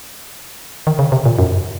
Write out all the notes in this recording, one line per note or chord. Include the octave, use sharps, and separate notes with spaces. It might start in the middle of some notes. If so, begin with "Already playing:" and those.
D#3
C#3
C3
A#2
F#2